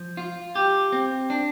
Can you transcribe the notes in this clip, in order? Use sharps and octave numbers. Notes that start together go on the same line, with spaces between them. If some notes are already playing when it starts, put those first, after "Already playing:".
Already playing: F3
F4
G4
C4
D4